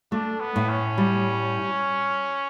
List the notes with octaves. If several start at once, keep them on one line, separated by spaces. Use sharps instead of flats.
A3 D4
B3
A2
C#4
G3